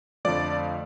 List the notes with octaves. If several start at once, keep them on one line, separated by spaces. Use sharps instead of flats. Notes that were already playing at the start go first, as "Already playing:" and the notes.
F2 D3 F3 A3 D5 D6